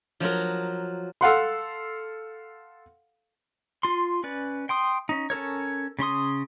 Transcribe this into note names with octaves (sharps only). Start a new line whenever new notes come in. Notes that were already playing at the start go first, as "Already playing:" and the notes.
F3 F#3 F4 A#4
A4 F5 F#5 C6
F4 C6
C#4 B4 D5
G5 C6 D#6
C#4 D#4
C#4 A4 A#4 C#5
C#3 C#4 C6 D#6